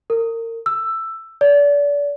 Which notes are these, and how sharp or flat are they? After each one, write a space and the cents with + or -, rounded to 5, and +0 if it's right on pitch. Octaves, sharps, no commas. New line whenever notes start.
A#4 -30
E6 +10
D5 -30